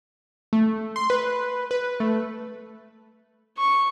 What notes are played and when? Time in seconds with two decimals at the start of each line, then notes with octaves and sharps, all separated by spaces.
0.53 A3
0.96 C6
1.10 B4
1.71 B4
2.00 A3
3.58 C#6